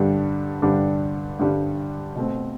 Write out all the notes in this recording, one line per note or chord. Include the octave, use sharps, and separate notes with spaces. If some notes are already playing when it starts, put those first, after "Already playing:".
Already playing: G2 D3 G3 D4
G2 D3 G3 D4
G2 D3 G3 D4
B2 A3 C4